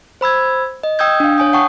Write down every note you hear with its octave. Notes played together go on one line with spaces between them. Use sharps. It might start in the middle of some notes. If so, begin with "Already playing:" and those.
C5 B5 E6 G#6
D#5
G5 D#6 E6 G6 G#6
D4 F5
C#5 G#5 D#6 G6
F#5 G5 A5 C#6 D#6